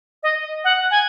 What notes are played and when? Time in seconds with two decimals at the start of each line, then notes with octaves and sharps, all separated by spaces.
0.23 D#5
0.64 F#5
0.91 G#5